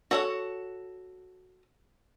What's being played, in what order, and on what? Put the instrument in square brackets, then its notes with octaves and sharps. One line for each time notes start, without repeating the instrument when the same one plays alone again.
[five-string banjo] F#4 A4 C#5 E5 F#5